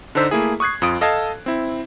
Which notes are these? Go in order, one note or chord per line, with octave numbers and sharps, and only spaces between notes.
D3 D4 D#4 C5 E6 B6
A3 A#3 E4 G#4
C#6 D#6 F#6 G#6 C7
F2 F4 D#6 D7
A4 D#5 F5 A5 G#6
C4 E4